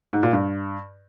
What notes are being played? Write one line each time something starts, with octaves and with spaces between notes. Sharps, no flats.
G#2
A#2
G2